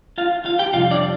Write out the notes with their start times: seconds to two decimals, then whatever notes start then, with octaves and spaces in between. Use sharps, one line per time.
0.18 F4 F5
0.45 F4 F5
0.59 G4 G5
0.73 F2 C3 G3 F4 F5
0.91 D4 D5